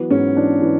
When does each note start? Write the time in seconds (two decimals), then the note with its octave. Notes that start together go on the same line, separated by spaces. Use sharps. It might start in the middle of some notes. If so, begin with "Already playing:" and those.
Already playing: E3 F#3 B3
0.10 G#2 C#4
0.36 E3 D4
0.62 E3